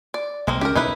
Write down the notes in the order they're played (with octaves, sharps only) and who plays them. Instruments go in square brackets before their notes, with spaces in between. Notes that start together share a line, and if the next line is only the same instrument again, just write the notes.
[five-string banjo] D5
[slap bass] B1 [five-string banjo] G#3 A#3 C4
[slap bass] C#2 C#3 C#4 [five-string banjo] G4 A#4
[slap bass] B1 [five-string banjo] D#4 E4 B4